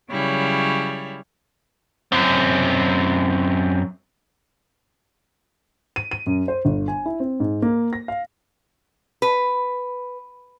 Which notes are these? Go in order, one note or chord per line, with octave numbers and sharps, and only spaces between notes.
C#3 F#3 G3 E4 C#5
F#2 C4
D#7
D#7
F#2
C5
G1
G#5
E4
C4
G#2
A#3
A#6
F5
B4